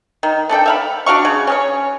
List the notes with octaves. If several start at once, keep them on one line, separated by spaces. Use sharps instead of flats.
D#3
A3 D4 A4 G5
E5 F5 B5
D4 F#4 F5 C#6
C#3
C#4 G#4 C#5